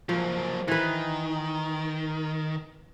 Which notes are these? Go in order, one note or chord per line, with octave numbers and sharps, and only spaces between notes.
F3 F#3 A#3
D#3 E3 B4